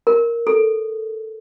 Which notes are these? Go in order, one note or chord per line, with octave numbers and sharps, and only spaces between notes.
A#4
A4